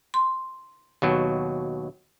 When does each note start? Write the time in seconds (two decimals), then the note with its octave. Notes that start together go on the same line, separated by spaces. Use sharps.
0.14 C6
1.02 D#2 B2 F#3